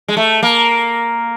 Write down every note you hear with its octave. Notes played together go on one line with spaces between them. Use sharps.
G#3
A3
A#3